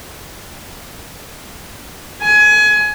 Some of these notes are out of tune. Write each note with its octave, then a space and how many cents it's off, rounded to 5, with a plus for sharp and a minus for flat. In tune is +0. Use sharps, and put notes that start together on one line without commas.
G#5 +25